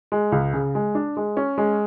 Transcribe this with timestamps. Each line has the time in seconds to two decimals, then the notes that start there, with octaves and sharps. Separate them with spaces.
0.12 G#3
0.32 C#2
0.54 C#3
0.75 G#3
0.95 D4
1.17 G#3
1.37 C#4
1.58 G#3